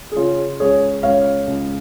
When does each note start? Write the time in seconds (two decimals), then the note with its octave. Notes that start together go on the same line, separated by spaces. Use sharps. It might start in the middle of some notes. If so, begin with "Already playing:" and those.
0.12 G#4
0.16 C#3 C#4 F4
0.60 C#2 G#4 C#5
1.03 C#2 C#5 F5
1.47 C#2